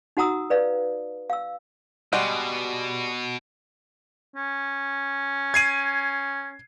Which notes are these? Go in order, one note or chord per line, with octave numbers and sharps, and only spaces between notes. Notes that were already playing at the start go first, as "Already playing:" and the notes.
D#4 F#4 F#5 A#5 D#6 E6
B4 D5 F5
F5 E6
B2 G3 G#3 F#4
C#4
G#6 C7 D#7